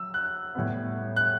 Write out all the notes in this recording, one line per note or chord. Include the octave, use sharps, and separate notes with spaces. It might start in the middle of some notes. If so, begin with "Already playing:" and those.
Already playing: F#3 E6
F#6
A2 G3 B3
F#6